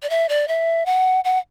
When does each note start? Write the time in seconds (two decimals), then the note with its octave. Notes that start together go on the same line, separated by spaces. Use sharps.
0.02 D5
0.10 E5
0.29 D5
0.48 E5
0.86 F#5
1.24 F#5